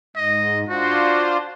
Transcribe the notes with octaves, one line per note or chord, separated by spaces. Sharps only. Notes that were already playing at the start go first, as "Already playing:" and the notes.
G#2 D#5
D4 F4 F#4 C5